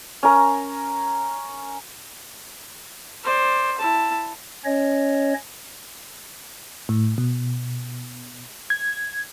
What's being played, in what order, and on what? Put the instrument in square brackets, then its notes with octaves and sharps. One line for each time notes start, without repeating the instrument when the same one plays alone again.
[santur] C#4 A#4
[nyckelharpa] C5 D5
E4 A5
[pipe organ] C#4 C#5 D#5
[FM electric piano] A2
B2
G#6